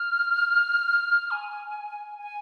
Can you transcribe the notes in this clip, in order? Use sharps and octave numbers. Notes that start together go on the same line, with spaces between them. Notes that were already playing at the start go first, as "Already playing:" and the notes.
Already playing: F6
G#5
G#5